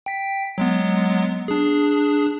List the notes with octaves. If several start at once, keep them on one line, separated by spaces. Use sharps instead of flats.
G5 B6
F#3 G#3 B3
D4 G#4